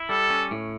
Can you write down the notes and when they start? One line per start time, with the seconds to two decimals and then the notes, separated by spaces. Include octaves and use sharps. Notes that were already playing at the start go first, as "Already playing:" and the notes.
Already playing: E4
0.09 G3 A4
0.30 C#4
0.51 A2